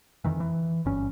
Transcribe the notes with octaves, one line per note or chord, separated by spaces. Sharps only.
F2 D#3 E3
E3
G1 G2 C#4